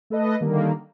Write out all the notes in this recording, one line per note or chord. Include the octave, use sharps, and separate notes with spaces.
A3 A4 B4 D#5
D3 D#3 G3 A#3